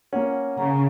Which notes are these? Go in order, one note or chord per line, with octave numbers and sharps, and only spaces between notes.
A#3 C#4 F#5
C#3 A#5